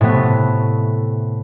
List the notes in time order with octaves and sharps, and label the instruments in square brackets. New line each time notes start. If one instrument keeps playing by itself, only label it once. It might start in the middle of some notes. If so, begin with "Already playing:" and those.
[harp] A2 C3 A3 B3